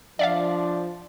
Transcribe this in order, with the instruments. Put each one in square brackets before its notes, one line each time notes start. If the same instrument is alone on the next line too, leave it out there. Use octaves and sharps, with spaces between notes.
[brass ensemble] F3 [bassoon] D4 [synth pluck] D5 E5 F5